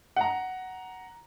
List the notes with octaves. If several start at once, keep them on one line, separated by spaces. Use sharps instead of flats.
F#5 A#5